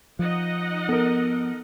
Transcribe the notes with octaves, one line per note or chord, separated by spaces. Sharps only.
F3 D#4 D#5 F#5
B3 A4 A#4